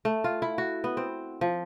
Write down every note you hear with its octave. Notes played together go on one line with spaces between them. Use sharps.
A3
F4
E4
F#4
B3
C4
F3